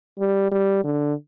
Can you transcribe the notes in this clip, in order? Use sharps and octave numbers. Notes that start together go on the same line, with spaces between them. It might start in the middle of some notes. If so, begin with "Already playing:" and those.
G3
G3
D3